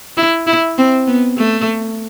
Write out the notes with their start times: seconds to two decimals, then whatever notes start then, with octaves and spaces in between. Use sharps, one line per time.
0.17 E4
0.47 E4
0.78 C4
1.07 B3
1.38 A3